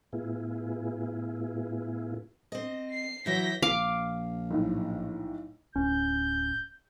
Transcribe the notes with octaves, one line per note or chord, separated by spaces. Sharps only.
A2 B3 E4 F4 G#4
C4 D#5
C7
E3 F#3 E4 G6 A#6 B6
A#1 F5 D6
B1 A2
D1 C#4 G6